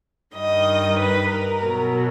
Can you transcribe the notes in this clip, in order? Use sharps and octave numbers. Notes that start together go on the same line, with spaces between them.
G2 D#3 G3 D#5
B4
A#4
B2 F#3